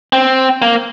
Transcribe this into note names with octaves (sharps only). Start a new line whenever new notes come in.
C4
A#3